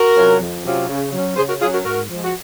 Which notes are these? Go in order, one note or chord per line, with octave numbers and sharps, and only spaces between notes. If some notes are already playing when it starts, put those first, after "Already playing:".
Already playing: F#4 A#4
C3 F#3 C#4 F4
F2
C3 F#3 C#4 F4
C#3
F#3 C#4
C#3 G#4 C5
F#4 A#4
F#3 C#4 F4 G#4
F#4 A#4
G#2 F#4 A#4
F3 G#3
F#4